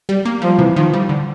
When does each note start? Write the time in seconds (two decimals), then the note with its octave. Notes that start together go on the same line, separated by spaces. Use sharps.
0.09 G3
0.25 A#3
0.42 F3 G3
0.59 C3 E3
0.76 D#3 F3
0.94 G3
1.09 D3